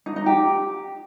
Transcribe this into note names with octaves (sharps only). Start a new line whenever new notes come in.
D#4
D#4
G4